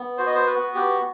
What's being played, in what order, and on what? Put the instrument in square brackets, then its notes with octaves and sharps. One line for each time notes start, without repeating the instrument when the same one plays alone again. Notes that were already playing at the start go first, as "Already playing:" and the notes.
Already playing: [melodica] B3
F#4 C5
D#5
C5
B4
B3
G4